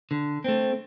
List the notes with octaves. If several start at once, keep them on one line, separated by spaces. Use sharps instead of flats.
D3
A3 C4